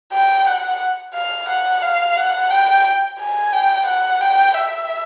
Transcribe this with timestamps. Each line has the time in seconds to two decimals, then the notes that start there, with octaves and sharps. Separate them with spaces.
0.13 G5
0.46 F#5
1.14 F5
1.49 F#5
1.82 F5
2.17 F#5
2.50 G5
3.19 G#5
3.53 G5
3.86 F#5
4.21 G5
4.55 E5